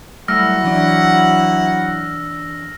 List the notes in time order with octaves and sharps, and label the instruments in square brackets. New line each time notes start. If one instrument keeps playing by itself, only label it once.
[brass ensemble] F#3 E4 F#5 [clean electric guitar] G3 A3 [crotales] E6 F6 A#6
[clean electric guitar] E3 D4